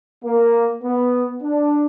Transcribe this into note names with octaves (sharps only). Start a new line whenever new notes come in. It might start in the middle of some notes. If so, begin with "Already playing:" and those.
A#3
B3
D4